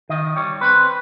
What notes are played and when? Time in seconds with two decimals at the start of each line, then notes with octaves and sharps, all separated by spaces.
0.09 D#3 D#5
0.36 G3 C#5
0.61 C4 B4